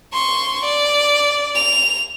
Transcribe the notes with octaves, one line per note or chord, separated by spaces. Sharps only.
C6 C#6
D5
F7